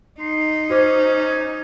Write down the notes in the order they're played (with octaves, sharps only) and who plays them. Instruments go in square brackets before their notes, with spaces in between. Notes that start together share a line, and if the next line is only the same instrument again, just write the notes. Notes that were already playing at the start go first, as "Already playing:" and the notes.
[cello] D#4 [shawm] C6
[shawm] C#4 [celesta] F#4 C5 D6